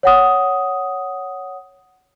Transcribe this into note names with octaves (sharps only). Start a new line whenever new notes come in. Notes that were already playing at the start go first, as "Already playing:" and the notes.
C#5 F#5 D#6